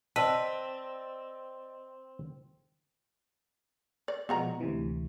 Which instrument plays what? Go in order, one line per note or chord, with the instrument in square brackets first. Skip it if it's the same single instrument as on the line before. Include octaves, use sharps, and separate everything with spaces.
[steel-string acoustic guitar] C4 [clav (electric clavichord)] B4 [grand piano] D5 D#5 E6 [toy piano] A5
[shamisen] D5
[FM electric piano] B2 F3 [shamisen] G#3 F#4 A#5
[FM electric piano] D2 C3 E3